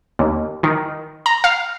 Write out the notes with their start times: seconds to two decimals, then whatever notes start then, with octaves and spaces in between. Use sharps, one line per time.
0.19 D#2
0.63 D#3
1.26 A#5
1.44 F5